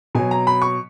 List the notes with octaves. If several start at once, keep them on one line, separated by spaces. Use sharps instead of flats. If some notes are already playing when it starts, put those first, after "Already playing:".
B2 F#3 G#5
A#5
B5
C#6